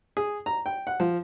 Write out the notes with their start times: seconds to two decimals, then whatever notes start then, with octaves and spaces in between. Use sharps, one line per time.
0.17 G#4
0.46 A#5
0.66 G5
0.87 F#5
1.00 F3